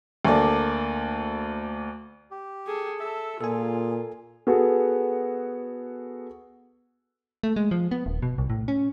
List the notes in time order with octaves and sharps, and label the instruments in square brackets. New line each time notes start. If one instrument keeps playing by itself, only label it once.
[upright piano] D2 A#3 A4 D5
[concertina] G4
[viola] G#4 A4
[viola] A4 [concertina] E5 E6
[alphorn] A#2 [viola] F4 [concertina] G#4 [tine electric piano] A4 G#5
[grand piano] B3 F#4 G#4 A4
[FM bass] A3
G#3
F3
B3
D#1
B2
C2
A2
C#4